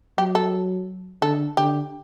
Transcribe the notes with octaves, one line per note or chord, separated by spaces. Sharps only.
F#3 G4
A4
D3 A4
D3 G4